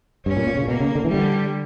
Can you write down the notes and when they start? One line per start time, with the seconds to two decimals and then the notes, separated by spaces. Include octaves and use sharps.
0.26 G2 C#4
0.37 A#2
0.47 A#2
0.57 C#3
0.67 B2 A#3
0.80 C#3
0.95 D3
1.05 E3
1.09 G3
1.14 D3